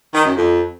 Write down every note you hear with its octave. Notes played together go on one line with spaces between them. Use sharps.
D#3
F#2
F2